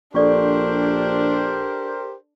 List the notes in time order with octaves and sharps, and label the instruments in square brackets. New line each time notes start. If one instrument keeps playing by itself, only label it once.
[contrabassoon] A#1 [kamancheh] D4 [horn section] G4 A#4 C5 [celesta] A4 D5 C#6